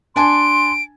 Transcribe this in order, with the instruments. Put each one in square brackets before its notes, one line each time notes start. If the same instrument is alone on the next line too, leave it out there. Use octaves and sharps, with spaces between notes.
[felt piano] D4 G#5 A5 [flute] C6 [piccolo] D7